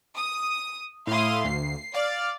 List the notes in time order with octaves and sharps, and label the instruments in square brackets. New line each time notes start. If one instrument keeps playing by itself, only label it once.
[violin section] D#6
[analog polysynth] A2 E4 [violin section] F5 C6 D#6
[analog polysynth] D2 [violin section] C7
[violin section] D5 [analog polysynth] F5